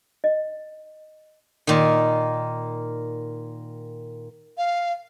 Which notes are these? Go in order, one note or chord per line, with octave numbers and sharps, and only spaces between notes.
D#5
A#2 D#3
F5